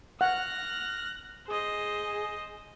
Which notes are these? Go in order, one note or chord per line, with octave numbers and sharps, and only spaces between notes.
F#5 F6 F#6 A#6
G#4 C5 D#5